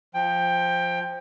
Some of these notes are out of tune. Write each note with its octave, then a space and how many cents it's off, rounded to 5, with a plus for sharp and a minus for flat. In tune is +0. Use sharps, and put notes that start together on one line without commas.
F3 +0 G5 +15